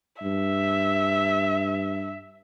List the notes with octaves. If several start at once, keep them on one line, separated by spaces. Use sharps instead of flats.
G2 E5